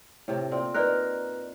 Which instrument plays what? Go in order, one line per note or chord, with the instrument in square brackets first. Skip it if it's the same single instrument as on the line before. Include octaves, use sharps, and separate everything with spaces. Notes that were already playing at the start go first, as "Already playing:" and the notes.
[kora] A2 C3
A#2 C4
[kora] D#4 A#4 [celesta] B4 D5 F#6